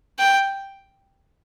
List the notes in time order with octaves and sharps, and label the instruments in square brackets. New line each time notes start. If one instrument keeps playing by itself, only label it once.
[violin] G5